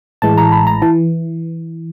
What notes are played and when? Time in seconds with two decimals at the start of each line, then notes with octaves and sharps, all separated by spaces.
0.22 A1 A2 E3 G#3 A5
0.37 A#5
0.52 B5
0.67 A#5
0.82 E3 A5